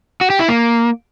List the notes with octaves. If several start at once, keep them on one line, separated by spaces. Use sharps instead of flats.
F#4
G4
E4
A#3